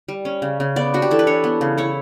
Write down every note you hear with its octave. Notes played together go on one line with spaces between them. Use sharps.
G3
C#4
C#3
C#3
B3 D5
D4 F#4
G4
E3 A4
B4
D4 C#5
B3
C#3
E4 C#5